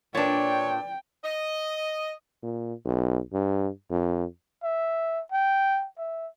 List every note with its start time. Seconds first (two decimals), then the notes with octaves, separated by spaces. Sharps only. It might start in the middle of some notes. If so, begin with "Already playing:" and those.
0.15 A#2 D4 B4 C#5 D5 G5 A6
1.24 D#5
2.43 A#2
2.85 B1
3.33 G2
3.90 F2
4.63 E5
5.32 G5
5.98 E5